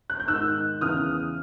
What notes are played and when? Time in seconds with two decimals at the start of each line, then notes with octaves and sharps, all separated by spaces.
0.10 F#6
0.20 G6
0.28 G#2 D#3 E6 F#6
0.81 E2 C#3 E3 D#6 F6